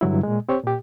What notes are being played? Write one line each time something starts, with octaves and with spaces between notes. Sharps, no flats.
G2 D3 F#3 E4
A#2 G#3
C4 G4 C5 C#5
A#2 G4